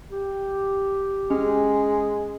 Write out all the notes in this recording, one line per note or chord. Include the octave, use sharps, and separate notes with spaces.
G4
G#3 C#4